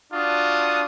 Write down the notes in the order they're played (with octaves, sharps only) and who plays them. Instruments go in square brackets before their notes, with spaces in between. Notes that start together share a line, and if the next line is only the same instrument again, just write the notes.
[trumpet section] D4 F4 F#4 D#6